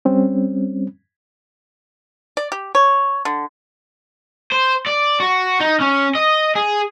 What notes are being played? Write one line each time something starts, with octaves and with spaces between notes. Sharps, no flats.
G3 C4 C#4
D5
G4
C#5
D3
C5
D5
F#4
D#4
C#4
D#5
G#4